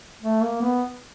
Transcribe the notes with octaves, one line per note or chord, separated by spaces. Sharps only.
A3
A#3
B3